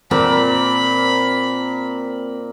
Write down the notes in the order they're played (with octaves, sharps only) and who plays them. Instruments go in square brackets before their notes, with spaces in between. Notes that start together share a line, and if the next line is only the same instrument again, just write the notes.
[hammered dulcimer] A#2 A#4 A5 [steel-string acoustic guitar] C4 [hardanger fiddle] B5